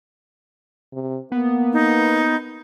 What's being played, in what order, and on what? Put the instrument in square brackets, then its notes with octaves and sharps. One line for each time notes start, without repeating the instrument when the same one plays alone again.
[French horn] C3
[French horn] A#3 [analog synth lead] B3
[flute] D#4